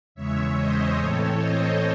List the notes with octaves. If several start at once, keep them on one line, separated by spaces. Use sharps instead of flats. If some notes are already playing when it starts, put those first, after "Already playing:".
E2 C#3 G#3 C#5 E5
C5 D#5
A2 E3 C4 A4 C#5
C5 D#5